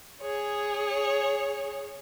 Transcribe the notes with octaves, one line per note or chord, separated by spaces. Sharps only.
G#4 C#5